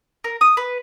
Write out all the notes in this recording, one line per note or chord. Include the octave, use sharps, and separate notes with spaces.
A#4
D#6
B4